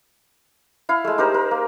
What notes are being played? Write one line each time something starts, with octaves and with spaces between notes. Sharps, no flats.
E4 F5
G#3 A3
D#4 G4 A#4 C5
A#4
A#3